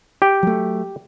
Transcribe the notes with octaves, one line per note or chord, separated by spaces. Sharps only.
G4 G5
F#3 A3